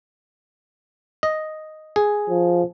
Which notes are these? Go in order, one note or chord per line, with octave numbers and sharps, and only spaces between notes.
D#5
G#4
F3